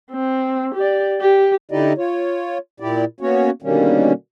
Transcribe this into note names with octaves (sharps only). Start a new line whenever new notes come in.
C4
G4 D5
G4
D3 D#4 E4 G4 D5 D#5
F4 C#5
A#2 E4 G4 D5
A#3 B3 C#4 F#4 C#5
B2 D3 D#3 G3 A#3 C#4